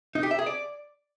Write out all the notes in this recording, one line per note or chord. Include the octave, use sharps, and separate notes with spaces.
D#4
G4
E5
G#4
D5